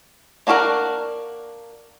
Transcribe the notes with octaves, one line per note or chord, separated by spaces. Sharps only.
A#3 D4 F#4 G#4 A#4